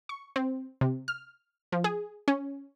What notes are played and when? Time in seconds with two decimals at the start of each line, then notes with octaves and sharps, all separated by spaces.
0.09 C#6
0.36 C4
0.81 C3
1.08 F6
1.72 F3
1.84 G#4
2.28 C#4